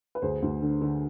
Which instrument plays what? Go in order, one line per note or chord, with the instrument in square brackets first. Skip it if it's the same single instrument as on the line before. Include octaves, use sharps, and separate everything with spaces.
[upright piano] B4
D2 G#4 C5
D2
D3
D3